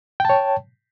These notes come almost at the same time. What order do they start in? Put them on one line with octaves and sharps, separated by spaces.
G5 A5 C#5